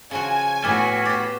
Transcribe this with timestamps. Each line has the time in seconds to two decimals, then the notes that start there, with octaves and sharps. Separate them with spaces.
0.11 C#3 F3 F#4 G#5
0.62 A2 B3 E4 F#4 A4 D6 F6 G#6
1.06 B3 G4 D6 A6 C7